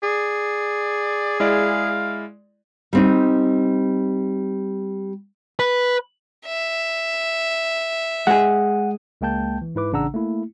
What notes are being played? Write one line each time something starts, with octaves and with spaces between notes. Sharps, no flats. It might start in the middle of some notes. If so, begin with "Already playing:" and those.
G#4 D5
G#3 E4 D5 F5
G3 C4 D#4
B4
E5
G#3 G#4 F#5
C#2 G#3 A#3 G5 A5 G6
E3
G#2 E4 B4 D6
A1 C#3 D4 F#5 A#5 E6
A3 A#3 E4